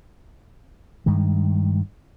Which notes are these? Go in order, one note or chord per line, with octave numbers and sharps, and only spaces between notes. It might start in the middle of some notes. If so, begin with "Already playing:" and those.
G2 D#3 G#3